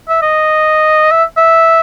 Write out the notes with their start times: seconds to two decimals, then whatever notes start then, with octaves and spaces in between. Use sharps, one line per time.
0.08 E5
0.22 D#5
1.11 E5
1.37 E5